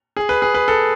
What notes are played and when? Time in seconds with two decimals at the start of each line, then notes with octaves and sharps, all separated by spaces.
0.17 G#4
0.29 B4
0.42 G#4
0.54 B4
0.68 A4